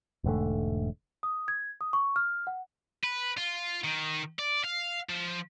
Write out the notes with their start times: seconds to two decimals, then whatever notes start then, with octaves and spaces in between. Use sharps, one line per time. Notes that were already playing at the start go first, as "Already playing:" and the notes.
0.24 E1 G#2 D3 A3
1.23 D#6
1.48 G#6
1.81 D#6
1.93 C#6
2.16 F6
2.47 F#5
3.04 B4
3.37 F4
3.84 D#3
4.39 D5
4.64 F5
5.09 F3